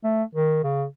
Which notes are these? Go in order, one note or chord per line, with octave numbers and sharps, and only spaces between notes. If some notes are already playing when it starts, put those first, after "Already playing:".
A3
D#3
C#3